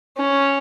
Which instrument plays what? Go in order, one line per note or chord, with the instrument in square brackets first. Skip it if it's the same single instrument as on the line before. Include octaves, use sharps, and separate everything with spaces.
[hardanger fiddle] C#4